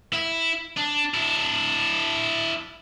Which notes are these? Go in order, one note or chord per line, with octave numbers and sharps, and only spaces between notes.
E4
D4
D4 E4